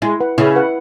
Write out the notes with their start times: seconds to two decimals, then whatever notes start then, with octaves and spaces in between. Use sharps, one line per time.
0.02 G#3 E4
0.20 B4 F#5
0.38 C#3 E4
0.56 B4 F#5